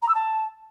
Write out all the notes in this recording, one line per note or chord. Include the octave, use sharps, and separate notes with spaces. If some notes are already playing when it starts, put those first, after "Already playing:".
A#5
E6
A5